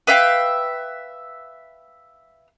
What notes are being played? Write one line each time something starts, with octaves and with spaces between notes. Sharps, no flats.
B4 E5 F5 G5